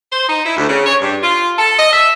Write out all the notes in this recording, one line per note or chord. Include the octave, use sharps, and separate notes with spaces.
C5
D#4
E4
D2
C#3
C#5
G2
F4
A4
D#5
E5